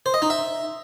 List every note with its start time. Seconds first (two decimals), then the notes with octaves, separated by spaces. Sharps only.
0.06 C5
0.14 D#5
0.22 D#4
0.30 E5